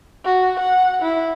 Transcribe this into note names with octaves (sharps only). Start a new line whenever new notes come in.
F#4
F#5
E4